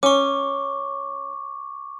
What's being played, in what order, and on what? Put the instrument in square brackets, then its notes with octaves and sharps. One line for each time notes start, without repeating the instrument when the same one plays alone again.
[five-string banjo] C#4 [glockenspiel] C#6 D6